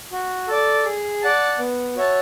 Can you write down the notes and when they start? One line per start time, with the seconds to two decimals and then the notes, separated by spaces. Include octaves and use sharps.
0.12 F#4
0.48 A4 D5
0.85 G#4
1.22 D5 F#5 A5
1.59 B3
1.96 F#4 C#5 E5 A5